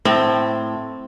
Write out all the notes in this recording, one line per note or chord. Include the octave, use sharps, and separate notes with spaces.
A2 C4